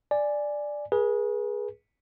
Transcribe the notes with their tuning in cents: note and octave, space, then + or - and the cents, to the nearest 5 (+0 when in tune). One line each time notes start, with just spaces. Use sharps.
D5 +0 G#5 +0
G#4 +0 B4 -35